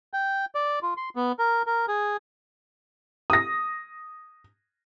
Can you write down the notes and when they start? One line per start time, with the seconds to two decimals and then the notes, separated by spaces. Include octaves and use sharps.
0.13 G5
0.55 D5
0.83 F4
0.97 C6
1.16 B3
1.39 A#4
1.66 A#4
1.88 G#4
3.30 D#6 A#6